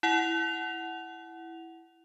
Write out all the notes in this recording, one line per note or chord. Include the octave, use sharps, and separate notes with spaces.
E4 F#5 F7